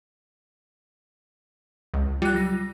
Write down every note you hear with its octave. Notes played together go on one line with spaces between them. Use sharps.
C#2
G3 F4 F#6
F#3 A#6